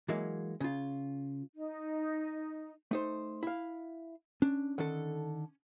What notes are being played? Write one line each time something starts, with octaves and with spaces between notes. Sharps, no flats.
E3 F#3 G#3 A#3
C#3 F4
D#4
A3 D#4 C5
E4 F5
C#4 D4
D3 D#3 A4